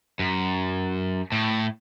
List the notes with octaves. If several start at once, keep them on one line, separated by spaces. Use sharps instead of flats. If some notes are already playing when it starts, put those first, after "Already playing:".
F#2
A2